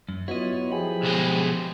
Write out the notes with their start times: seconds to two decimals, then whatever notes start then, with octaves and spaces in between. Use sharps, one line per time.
0.09 F#2
0.28 F#3 B3 E4 F4 C#5 D#5
0.72 F3 G4 G#4 B5
1.03 B1 G#3